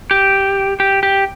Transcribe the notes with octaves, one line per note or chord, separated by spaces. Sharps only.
G4
G4
G4